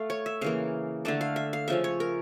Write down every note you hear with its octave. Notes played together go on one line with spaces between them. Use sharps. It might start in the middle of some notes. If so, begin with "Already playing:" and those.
Already playing: A3 F5
C#5
E5
C#3 E3 A#3 F5
D3 A3 D4 A5
F5
E5
F5
C#3 F3 C#4 E5
C#5
A#4